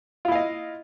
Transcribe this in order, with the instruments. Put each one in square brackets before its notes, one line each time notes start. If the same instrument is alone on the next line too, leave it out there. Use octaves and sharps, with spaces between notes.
[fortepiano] F4
E4
F5
D#5